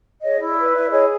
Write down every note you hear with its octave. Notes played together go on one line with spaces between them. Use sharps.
G#4 C#5 D#5
E4
D5 E5
B4
E4 D5 E5
G#4 C#5 D#5